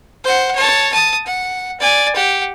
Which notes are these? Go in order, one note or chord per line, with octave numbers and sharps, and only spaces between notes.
C5 F#5
C#5 A5
A5 D#6
F#5
D5 G#5
G4 F#5